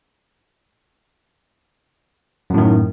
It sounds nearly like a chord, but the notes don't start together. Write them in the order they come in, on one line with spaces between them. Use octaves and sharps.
F#2 A2 D#3